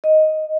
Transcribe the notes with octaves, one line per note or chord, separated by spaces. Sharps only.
D#5